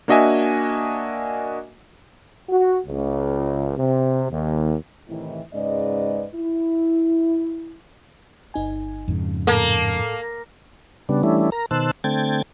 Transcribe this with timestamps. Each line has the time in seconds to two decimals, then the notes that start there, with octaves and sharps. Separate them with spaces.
0.08 A#3 D4 F#4 D#5 E5 G#5
2.49 F#4
2.86 C#2
3.77 C3
4.29 D#2
5.09 A2 C3 D#3 E3 D#4 E4
5.54 G#2 C#3 G#3 B4 D5 D#5
6.35 E4
8.54 G1 D#4 G#5
9.08 F2 G#2 C#3
9.47 A2 A#3 A4 A5
11.09 C#3 G3 B3 D4
11.23 E3 G3 A3 C#4 D4 E4
11.52 A#4 A#5
11.71 B2 D#3 C5 A5 E6 F#6
12.04 D3 A3 C4 G5 G#6 A6